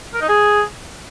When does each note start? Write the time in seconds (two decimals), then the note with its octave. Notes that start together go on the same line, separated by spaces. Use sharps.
0.14 A#4
0.21 D#4
0.29 G#4